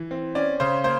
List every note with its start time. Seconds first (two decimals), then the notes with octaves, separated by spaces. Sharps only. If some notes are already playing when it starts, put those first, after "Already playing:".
Already playing: E3
0.11 C4
0.35 C#4 D5
0.60 C#3 C5
0.84 A#3 C5